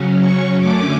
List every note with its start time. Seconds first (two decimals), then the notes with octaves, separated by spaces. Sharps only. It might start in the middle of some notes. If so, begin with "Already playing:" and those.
Already playing: C#3 F#3 C#4
0.21 C#6
0.60 F#2 D3 A3 C#4 D6